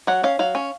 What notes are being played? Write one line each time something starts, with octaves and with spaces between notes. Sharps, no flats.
F#3 F#5
C#4 F5
F#3 F5
C#4